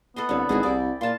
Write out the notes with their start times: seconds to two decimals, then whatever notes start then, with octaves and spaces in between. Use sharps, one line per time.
0.16 B3 A4 D#5 C6
0.29 C2 D3 C#5
0.49 G#1 E4 F#4 G#4
0.63 C2 D5 G5
1.01 A#2 F4 A5 C6